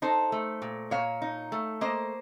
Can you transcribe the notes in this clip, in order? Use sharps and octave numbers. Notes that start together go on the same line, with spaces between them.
D#4 A4 C5
A3
A#2
A#2 C#5 F5
D#4
A3
A#3 C5 D#5